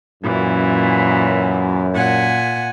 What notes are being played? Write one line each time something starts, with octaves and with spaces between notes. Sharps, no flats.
F#2 A#2 E3
A#2 F#5 G#5